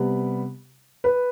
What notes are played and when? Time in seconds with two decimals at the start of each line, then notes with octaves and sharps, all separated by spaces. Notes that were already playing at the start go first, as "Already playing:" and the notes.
Already playing: C3 G3 B3
1.04 B4